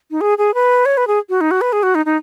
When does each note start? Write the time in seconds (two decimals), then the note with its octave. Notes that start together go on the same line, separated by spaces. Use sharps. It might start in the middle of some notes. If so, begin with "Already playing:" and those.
0.11 D#4
0.21 G#4
0.38 G#4
0.54 B4
0.86 C#5
0.97 B4
1.07 G#4
1.29 F#4
1.41 D#4
1.51 F#4
1.61 B4
1.73 G#4
1.83 F#4
1.95 D#4
2.06 D#4